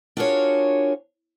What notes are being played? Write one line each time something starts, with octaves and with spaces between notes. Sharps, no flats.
D4 F4 F#4 G#4 A#4 C#5